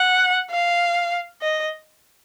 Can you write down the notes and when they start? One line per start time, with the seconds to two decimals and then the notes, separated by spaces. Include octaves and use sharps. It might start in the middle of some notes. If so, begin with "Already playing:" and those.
Already playing: F#5
0.50 F5
1.42 D#5